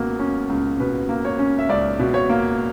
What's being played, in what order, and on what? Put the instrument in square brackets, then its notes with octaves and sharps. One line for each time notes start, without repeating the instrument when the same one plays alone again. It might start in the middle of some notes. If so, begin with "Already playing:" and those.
Already playing: [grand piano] C#2 B2 A#3
C#4
C#2
B2 B4
A#3
C#5
C#4
E5
C#2 D5
B2
C#5
A#3